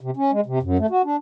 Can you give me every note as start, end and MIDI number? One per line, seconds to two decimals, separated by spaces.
0.01 0.11 48
0.17 0.31 61
0.32 0.41 56
0.46 0.59 48
0.63 0.77 42
0.79 0.86 57
0.90 1.02 66
1.05 1.16 62